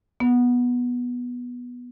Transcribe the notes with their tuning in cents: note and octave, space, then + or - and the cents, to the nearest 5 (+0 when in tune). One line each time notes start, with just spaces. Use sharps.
B3 -10